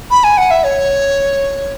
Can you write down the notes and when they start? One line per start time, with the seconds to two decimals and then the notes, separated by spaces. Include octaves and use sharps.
0.11 B5
0.24 G#5
0.38 F#5
0.51 E5
0.64 C#5